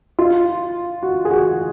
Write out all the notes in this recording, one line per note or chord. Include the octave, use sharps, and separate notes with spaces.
F4
F#4
G#4
F#4